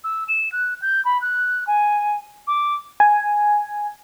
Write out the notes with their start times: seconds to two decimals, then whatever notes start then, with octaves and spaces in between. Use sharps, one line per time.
0.04 E6
0.28 E7
0.52 F#6
0.82 G6
1.05 B5
1.21 F#6
1.67 G#5
2.47 D6
3.00 G#5